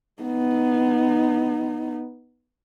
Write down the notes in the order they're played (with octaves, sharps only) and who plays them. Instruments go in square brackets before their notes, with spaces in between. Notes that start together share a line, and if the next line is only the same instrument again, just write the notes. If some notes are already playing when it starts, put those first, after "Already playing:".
[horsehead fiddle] B3 D#4